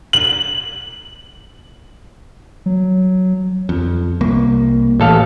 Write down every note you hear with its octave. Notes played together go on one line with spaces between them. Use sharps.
F#7
F#3
F2
C2 A#3
A1 A4 F5